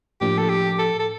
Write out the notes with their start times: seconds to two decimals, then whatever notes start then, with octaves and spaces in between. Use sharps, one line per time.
0.21 A2 F3 A#3 D4 G4
0.38 A4
0.49 G4
0.79 A4
0.99 A4